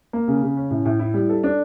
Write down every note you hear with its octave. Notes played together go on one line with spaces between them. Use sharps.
A#3
C#3
C#3
C#4
A2
A2
E4
G3
A4
D4